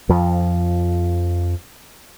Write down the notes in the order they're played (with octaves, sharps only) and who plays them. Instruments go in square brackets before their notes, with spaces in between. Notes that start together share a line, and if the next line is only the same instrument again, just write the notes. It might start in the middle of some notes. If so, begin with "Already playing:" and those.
[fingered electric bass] F2 F3